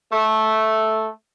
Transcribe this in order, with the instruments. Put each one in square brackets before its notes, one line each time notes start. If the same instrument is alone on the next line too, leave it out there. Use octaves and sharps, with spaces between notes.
[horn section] A3